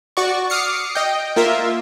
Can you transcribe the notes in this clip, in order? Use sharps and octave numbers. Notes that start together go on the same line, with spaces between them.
F#4 D5 C#6
D6 D#6 F6 C7 C#7
D#5 G5
A#3 F4 A#4 E5